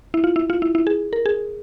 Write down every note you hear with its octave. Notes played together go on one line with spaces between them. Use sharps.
E4
F4
E4
F4
E4
E4
G#4
A#4
G#4